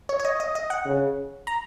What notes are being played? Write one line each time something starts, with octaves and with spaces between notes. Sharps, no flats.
C#5
C#5
D#5
D#5
D#5
F#5
C#3
A#5